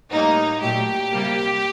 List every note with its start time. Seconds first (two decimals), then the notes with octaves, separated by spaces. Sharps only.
0.11 A2 G3 A#3 D#4
0.61 A#2 F#3 A3 G4
1.12 C3 G3 A#3